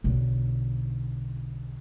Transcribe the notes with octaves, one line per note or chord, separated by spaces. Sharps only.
B1 D3